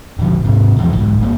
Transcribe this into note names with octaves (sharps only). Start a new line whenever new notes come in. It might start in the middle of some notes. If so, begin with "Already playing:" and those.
D#1 A#1 D3 F3
G#2 C3
D1 E2 E3 F3
B1 G#2
G1 A#3